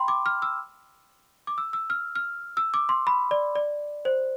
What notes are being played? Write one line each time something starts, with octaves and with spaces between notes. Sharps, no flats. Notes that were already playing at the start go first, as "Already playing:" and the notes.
Already playing: G5 B5 C6
D6
F6
E6
D6
E6
E6
F6
F6
E6
D6
C6
B5
D5
D5
C5